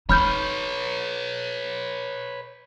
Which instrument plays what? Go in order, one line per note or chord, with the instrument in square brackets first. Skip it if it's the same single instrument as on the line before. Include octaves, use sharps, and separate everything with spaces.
[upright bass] D#4 [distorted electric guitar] B4 C#5 [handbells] B5 F6 G6